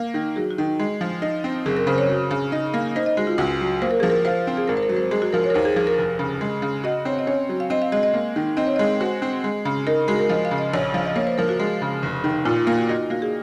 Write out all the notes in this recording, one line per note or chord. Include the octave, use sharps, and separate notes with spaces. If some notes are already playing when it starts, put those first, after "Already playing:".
Already playing: A#3
D#3
F#3 G#4
F#4
D#3
G#3
F3
D#4
C4
F#1 G#4
A#4
C#3 C5
C#5
F#3
C#3
D#4
A#3
D#4 C5
D#5
G#3 F#4
F4
C#2 F#4
F#3
A#3 C5
A#4
F3 G#4
A#4
F4 C5
C4
G#4
G#1 A#4
C5
A#4
F#3
C5
G#3 G#4
F#4
F3 A#4
C#5
A#4
D#2 C5
G#4
F3 G#4
A#4
F1
C#3
G#3
C#3
F#4 D#5
C4 C#5
D#5
C#4 C#5
F#3
F5
C4 D#5
F5
G#3 D#5
D#5
A#3
D#3
C4 D#5
C#5
G#3 D#5
F#4 C5
C4
G#3
C#3
D#4 A#4
G#3 F#4
A#4
F3 D#5
F5
C#3
D#5
A#1 C#5
F3 F5
D#5
A#3 C#5
C5
F3 A#4
F#4
G#3
C#3
F1
D#3
A#2 F4
F4
A#3 F4
F#4
D#4 F#4
A#3 F#4
G#4